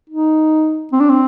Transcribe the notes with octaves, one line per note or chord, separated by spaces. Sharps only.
D#4
C4
D4
C4